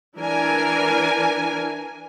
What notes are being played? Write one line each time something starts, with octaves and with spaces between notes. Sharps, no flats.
E3 D4 A#4 G#5